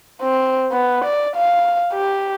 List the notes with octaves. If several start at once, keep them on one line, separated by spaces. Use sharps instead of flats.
C4
B3
D5
F5
G4